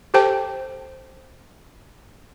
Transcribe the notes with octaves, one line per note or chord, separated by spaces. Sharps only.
G4 A4 C5 G5 A5